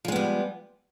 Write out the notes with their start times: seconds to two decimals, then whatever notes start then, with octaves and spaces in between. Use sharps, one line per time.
0.05 F3
0.08 G#3
0.12 B3
0.16 G3